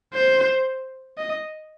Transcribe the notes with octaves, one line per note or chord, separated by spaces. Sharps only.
C5
D#5